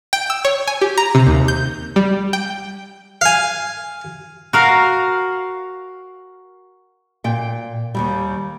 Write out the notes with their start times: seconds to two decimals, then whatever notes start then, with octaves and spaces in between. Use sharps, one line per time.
0.13 G5
0.30 E6
0.45 C#5
0.67 G#5
0.81 G4
0.98 A#5
1.15 C3
1.27 D#2
1.48 G6
1.96 G3
2.33 G5
3.21 F5 G#5
4.53 F#4 A#4 F5
7.24 A#2 G5
7.95 D#2 G#2 G3